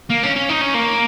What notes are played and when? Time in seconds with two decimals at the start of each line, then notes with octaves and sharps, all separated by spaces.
0.10 A#3
0.23 C#4
0.36 C#4
0.49 D#4
0.61 C#4
0.75 A#3